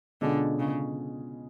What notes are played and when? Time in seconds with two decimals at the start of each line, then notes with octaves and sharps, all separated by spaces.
0.21 B2 D3 G#3 C#4 F4 G#4
0.59 C#3